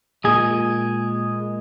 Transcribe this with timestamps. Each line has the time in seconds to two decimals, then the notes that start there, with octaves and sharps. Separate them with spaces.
0.24 A#2 G#3 G#4